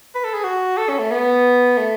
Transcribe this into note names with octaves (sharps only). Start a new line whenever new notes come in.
B4
A4
G#4
F#4
A4
C#4
A3
B3
A3